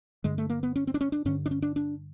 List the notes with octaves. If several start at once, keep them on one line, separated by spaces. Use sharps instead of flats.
G2 D3 G#3
A3
A#3
B3
C#4
C4
D4
C#4
D4
G2 D3 C#4
D4
C#4
D4
D4